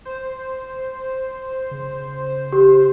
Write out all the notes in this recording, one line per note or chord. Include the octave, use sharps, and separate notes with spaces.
C5
C#3
G4